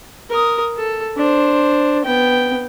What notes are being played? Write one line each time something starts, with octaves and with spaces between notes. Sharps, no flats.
A#4 D#6
A4
D4 C5
B3 G5